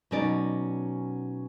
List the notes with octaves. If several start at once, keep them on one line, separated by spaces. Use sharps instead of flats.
B2 F#3 C#4 D#4 D5